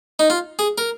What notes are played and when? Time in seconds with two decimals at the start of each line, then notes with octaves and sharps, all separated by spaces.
0.19 D#4
0.30 F4
0.59 G#4
0.78 A#4